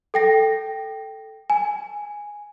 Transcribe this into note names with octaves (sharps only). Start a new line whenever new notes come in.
A4 G5 A#6
G#5